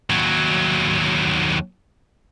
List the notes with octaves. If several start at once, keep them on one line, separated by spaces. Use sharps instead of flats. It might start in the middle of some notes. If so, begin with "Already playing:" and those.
D#2 F#3